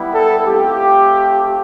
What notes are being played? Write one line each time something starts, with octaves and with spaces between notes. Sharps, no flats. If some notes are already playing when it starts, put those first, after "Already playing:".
Already playing: G3 B3 E4
A4
A3 C4 F4 G4